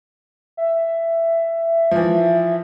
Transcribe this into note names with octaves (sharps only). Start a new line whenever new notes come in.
E5
E3 F3